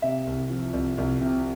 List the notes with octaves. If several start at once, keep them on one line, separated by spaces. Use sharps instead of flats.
C3 E5
C2
F3
C2
C2
C3